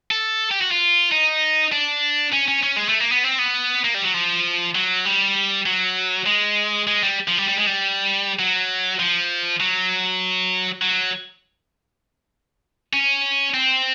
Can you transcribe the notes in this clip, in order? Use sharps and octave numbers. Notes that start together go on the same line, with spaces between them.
A4
G4
F#4
F4
D#4
D4
C#4
C#4
C#4
G#3
A3
A#3
B3
C4
B3
A#3
G3
F#3
F3
F#3
G3
F#3
G#3
G#3
G3
F3
G3
G3
G#3
G3
F#3
F3
F#3
F#3
C#4
C4